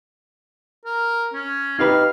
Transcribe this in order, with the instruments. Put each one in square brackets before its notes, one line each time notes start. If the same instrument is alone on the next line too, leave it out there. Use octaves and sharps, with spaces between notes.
[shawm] A#4
C#4
[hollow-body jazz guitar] D#4 G4 B4 [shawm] F5